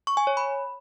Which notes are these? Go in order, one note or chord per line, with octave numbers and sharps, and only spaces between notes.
C#6
G#5
C#5
B5